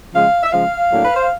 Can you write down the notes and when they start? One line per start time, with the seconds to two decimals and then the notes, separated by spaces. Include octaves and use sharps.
0.14 C#3 F3 G#3 F5
0.43 E5
0.52 C#3 F3 G#3 F5
0.91 A2 F#3 A#3 D4
1.05 B4
1.16 C5